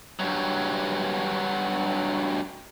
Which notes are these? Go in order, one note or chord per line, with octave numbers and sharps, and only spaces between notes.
G2 F#3